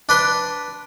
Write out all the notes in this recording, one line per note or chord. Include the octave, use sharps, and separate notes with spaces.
D4 B4 C6